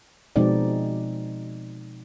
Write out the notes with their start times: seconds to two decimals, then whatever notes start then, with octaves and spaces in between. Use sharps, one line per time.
0.36 B2 F3 G#3 C4 D#4 D5